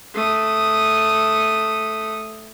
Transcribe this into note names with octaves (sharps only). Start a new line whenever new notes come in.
A3 D#6